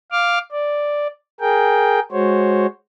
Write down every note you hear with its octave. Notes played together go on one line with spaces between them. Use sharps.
F5 D6 F6
D5
G#4 A#4 G5
G#3 F#4 C5 C#5